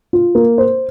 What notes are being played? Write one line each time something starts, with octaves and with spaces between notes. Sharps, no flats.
F4
A#3
C5